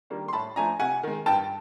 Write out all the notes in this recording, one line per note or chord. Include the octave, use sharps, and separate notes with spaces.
D#3 G3 A#3 D4
C6
A2 A5 B5
F3 A3 D4 G#5 A#5
C3 F#5 G#5
D#3 G#3
G2 G5 A5